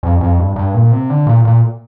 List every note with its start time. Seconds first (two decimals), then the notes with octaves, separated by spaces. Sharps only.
0.03 F2
0.21 F2
0.39 G2
0.56 G2
0.74 A#2
0.92 C3
1.10 D3
1.27 A#2
1.45 A#2